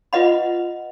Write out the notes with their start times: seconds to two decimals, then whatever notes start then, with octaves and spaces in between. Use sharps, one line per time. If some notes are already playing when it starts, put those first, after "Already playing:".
0.13 F4 B4 D#5 F#5 B5